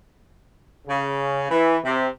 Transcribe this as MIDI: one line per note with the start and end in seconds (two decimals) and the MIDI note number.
0.87 1.45 49
1.50 1.76 52
1.84 2.07 48